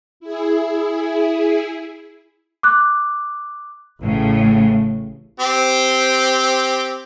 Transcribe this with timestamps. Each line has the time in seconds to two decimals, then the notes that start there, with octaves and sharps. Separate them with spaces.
0.20 E4 G#4
2.63 D6 F#6
4.02 A1 A2 C#3
5.40 C4 G4